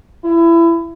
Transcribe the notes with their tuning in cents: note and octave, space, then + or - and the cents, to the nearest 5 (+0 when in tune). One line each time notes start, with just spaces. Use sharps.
E4 +25